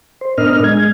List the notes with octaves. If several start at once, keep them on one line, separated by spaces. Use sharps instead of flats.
C5
A2 B3 D4 A#4 D#5 F6
G#3 G#6